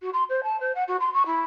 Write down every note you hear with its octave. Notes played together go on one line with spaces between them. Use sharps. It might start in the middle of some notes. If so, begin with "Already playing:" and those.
F#4
C6
C5
A5
C5
F#5
F#4
C6
C#6
E4